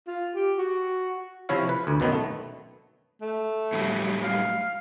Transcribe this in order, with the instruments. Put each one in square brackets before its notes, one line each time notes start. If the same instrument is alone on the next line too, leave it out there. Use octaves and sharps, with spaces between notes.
[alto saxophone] F4
G4
F#4
[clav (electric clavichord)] C3 F3 E4 C#5 F5
B4
D2
F#2 B2 D#3 B3
A3
[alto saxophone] A3
[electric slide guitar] A2 F#3 G3
[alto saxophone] F5